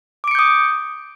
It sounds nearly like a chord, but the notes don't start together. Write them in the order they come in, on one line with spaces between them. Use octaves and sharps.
D6 D7 C#7 G6 D#6